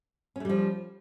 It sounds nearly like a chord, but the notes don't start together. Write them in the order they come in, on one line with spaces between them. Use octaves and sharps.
C#4 A3 G3 F3